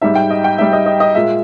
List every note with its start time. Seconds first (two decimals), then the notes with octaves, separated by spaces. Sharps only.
0.02 G#2 G3 E5
0.15 G5
0.31 D#5
0.44 G5
0.58 G#2 G3 E5
0.73 D#5
0.86 D#5
1.00 D#5
1.15 A#2 G#3 E5